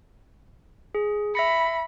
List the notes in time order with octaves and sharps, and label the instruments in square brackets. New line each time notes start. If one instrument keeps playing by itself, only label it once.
[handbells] G#4
[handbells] E5 A#6 C#7 [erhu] B5